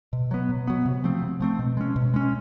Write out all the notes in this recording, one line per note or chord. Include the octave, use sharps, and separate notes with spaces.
B2
F#3 B3
B2
F#3 B3
C3
F3 A3 C4
C3
F3 A3 C4
B2
G#3 C#4
B2
G#3 C#4